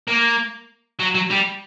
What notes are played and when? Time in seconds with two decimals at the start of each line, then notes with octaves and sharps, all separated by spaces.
0.08 A#3
0.99 F#3
1.15 F#3
1.31 G3